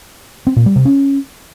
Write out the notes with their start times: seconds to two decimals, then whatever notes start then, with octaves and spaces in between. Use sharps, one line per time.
0.47 C4
0.56 A#2
0.66 G3
0.76 C3
0.85 C#4